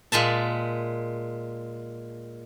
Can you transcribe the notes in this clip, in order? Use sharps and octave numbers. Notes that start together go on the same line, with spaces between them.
A#2 G#3 E5 A5